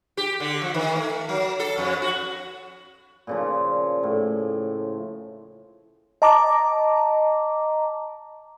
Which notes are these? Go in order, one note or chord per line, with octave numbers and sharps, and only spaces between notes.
G4
D3
F3
D#3
A3
F#3
A4
F2
F#4
A#2 C#3 F3
A2
D#5 A5 A#5 D6